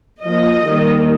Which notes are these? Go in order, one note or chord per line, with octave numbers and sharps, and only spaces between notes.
F3 A#3 D#5
D#3 G3 A#3